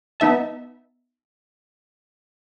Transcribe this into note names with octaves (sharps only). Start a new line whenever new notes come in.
B3 D#4 E5 A5